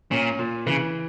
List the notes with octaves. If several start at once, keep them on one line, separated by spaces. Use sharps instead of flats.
A#2 C#4
A#2
C#3 E3